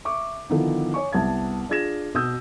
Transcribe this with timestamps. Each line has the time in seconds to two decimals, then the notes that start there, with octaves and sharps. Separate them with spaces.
0.05 E5 C#6 D6
0.49 D3 D#3 F3 B3 E4 A4
0.94 C#5 G#5 C#6
1.12 C2 B3 A5 G#6
1.69 D4 F4 G#4 G#6 A#6 E7
2.14 B2 D#6 E6 G6